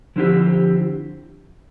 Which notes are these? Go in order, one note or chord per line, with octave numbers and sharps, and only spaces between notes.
D3 F3 C4 E4 G4